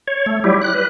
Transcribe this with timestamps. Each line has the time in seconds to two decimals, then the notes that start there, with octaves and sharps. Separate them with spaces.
0.08 C#5
0.26 A3
0.44 F#3 G3 E4 G4
0.61 F#6
0.74 B4